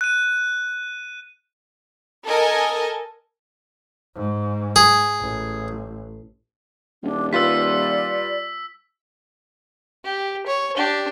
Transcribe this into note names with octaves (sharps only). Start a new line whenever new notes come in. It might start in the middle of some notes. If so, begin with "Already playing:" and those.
F#6 D#7
A4 A#4 D#5 G#5
G#2
G#4
A1
D#1 D4
G3 F4 B4 D5 E6 B6
G4
C#5
D4 G4